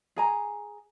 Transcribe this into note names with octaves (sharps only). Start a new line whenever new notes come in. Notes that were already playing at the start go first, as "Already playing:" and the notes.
G#4 G#5 A#5